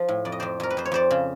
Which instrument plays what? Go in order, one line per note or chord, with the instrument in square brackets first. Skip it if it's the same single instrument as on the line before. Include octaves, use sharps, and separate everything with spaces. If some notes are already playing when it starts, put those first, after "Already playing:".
Already playing: [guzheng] F3
A2
F2 D5
D#5
F2 C5 D5
F2 A#4
B4
F2 C5
C#5
F2 C5 D5
C#3